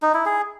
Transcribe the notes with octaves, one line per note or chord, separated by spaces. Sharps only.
D#4
E4
G#4